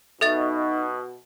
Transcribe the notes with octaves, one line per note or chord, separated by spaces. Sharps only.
B2 D#4 A4 E5 A6